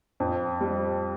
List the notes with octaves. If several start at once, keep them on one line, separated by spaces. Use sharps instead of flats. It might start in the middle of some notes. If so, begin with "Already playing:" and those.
F2
G3